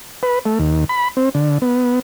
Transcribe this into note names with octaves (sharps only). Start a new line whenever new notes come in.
B4
A3
D#2
B5
C4
D3
B3